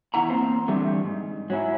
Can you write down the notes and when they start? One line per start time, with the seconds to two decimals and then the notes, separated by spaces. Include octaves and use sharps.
0.14 E2 E4 F#5 A#5
0.30 E2 A#3 C4 C5
0.68 D3 E3 G3 A3 C4 G4
1.04 G#2
1.50 F#3 C#4 E4